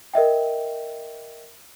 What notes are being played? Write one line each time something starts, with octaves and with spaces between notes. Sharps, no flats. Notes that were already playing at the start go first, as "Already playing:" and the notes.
A#4 D#5 E5 G5